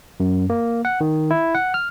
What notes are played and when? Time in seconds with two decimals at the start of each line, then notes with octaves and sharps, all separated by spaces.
0.20 F#2
0.50 A#3
0.85 F#5
1.01 D#3
1.31 E4
1.55 F#5
1.74 F6